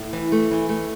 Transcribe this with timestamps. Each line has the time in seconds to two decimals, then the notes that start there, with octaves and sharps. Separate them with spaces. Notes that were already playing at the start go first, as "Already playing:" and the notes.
Already playing: A2
0.13 E3
0.32 A3
0.51 E3
0.69 A3